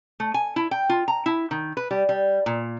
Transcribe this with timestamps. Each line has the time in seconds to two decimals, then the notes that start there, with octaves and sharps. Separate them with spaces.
0.20 A3
0.34 G#5
0.56 E4
0.71 G5
0.89 F4
1.08 A#5
1.26 E4
1.51 D#3
1.77 B4
1.91 G3
2.09 G3
2.46 A#2